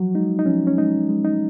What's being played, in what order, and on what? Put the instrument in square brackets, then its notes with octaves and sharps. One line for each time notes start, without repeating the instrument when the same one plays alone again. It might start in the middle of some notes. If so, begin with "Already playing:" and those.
Already playing: [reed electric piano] F3 F#3 F#4
G#3 D#4
D#4
F3 C#4
C#4
G#3 D#4
G#3
D#4